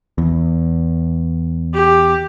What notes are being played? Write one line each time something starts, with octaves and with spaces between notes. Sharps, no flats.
E2
G4